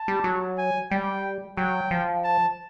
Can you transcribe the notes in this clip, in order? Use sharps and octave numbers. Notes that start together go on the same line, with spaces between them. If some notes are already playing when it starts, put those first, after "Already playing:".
Already playing: A5
G3
F#3
G#5
G3 G5
F#3 G5
F3
A5